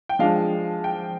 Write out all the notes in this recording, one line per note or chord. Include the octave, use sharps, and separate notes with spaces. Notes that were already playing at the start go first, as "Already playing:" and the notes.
G5
F3 G#3 D4 F5
G5